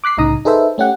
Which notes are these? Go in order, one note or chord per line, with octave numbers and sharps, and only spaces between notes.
D6 F#6 B6 C7
C2 A2 C#3 D#4 A#5 D#6
D#4 G#4 A4 B4 C5 E5
A3 C#4 G4 F#5